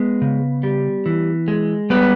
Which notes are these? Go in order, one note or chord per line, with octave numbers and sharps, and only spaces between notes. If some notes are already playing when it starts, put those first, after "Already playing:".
Already playing: G#3 B3 B4
C#3
G3
E3
G#3
G3 B3 B4